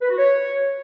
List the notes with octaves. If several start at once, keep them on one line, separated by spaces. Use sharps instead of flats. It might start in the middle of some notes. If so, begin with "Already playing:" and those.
B4
F#4
C#5